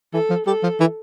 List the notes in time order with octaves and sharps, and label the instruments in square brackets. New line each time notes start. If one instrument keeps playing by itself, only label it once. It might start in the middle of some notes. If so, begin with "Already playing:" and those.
[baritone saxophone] E3 [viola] A4
[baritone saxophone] F3
[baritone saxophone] G3 [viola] A4
[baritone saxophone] F3
E3